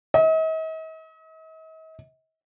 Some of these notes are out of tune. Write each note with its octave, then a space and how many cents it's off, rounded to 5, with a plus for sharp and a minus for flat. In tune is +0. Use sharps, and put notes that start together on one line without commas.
D#5 +45